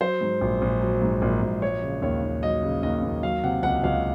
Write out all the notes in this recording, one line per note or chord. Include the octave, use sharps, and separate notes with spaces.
F#3 C5
G#2
A#1
A#1
F#3
G#2
A#1
A#1
F#3 C#5
C#3
D#2 C#5
D#2
F#3 D#5
C#3
D#2 D#5
D#2
F#3 F5
C3 F#5
C#2 F#5
C#2 F5